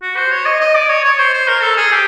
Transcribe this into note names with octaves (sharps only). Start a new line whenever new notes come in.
F#4
C5
C#5
D#5
D#5
D5
C#5
C#5
C5
C5
A#4
A4
G#4
G4